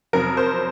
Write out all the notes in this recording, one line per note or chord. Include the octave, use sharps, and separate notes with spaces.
F2 C3 F#3 A#4
C5